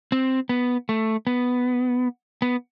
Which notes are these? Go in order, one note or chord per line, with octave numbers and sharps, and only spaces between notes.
C4
B3
A3
B3
B3